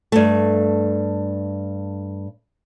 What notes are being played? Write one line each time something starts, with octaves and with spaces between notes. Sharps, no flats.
G2 A3